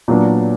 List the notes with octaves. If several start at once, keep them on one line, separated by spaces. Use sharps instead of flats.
A#2 F#3 B3 D4